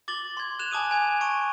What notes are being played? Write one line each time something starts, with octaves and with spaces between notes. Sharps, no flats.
D6 A6 F#7 G7
C6 G#6
F#6 E7 F7
G#5 A5 D6 D#6 D#7
G#5 G#6
A5 C#6 D7 D#7